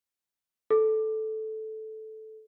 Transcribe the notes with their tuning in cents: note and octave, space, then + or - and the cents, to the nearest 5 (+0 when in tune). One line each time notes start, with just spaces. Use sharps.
A4 -10